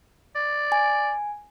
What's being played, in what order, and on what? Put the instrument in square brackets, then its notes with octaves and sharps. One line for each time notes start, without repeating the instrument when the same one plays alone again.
[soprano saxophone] D5
[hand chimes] G#5